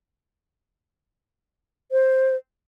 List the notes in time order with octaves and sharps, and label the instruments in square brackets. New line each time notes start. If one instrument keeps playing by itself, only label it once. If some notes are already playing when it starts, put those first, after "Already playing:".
[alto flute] C5